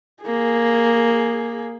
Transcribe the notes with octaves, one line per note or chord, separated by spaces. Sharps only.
A#3 G#4